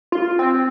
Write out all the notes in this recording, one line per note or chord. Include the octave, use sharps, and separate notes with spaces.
F4
C4